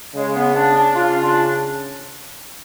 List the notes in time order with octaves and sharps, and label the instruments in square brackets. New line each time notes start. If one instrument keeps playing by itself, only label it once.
[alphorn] C#3 [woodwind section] G#3
[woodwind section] B3
D4
D4
[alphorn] C#3 [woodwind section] F4
[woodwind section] D4